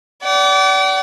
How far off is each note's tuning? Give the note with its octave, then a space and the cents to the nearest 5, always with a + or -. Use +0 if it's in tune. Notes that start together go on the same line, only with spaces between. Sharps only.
D5 -30 F#5 +45